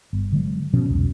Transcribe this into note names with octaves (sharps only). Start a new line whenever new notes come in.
G1
D3 F#3 G#3
B2 F3 C#4
C2 F2